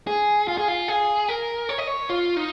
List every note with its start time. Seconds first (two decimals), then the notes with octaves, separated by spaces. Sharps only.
0.07 G#4
0.48 F4
0.58 G#4
0.68 F4
0.88 G#4
1.29 A#4
1.69 C#5
1.78 D#5
1.87 C#5
2.10 F4
2.37 D#4